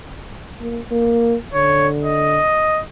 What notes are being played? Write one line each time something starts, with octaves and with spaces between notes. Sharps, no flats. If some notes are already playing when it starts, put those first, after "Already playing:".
A#3
A#3
D3 C#5
D#5